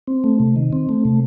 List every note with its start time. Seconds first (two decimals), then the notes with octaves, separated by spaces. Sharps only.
0.07 C4
0.24 A3
0.40 C3
0.56 D#3
0.73 C4
0.89 A3
1.05 C3